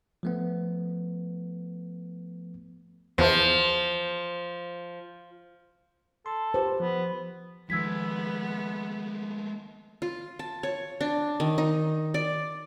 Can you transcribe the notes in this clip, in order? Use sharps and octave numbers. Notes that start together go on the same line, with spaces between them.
F3 A3 B3
E2 F3
A4 C6
F4 G4 B4 C5
F3 B3
D#3 F3 G#3 A3 B3 E6 G#6 B6
F4
A5
C#5
D4
D#3
D#4
D5